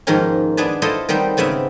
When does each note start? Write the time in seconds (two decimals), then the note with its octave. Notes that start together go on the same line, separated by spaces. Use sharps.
0.07 G#2 D#3 F3 A#3 C#4
0.57 B3 D4 G#4 B4 A5
0.82 E4 F4 A4 C5 D#5 F5
1.09 D#3 G3 B3 C4 G4
1.37 G#2 C#3 B3 C4 E5